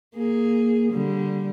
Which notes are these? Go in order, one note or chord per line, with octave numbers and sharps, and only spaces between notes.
A#3 G#4
D3 G3